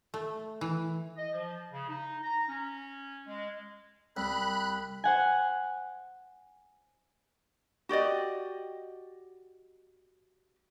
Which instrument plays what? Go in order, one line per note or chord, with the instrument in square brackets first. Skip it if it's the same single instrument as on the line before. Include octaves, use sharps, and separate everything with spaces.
[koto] A3
E3
[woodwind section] D#5
F3
C#3
D#4
A#5
C#4
G#3
[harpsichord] C2 [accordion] B5 F#6
[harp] C5 F#5 G#5
[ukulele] F#4 G4 D5 D#5